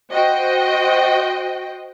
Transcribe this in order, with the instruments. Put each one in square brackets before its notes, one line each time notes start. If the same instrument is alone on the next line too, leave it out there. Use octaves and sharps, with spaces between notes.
[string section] F#4 C5 D#5 G5